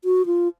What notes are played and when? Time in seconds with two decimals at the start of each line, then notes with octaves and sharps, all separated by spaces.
0.04 F#4
0.26 F4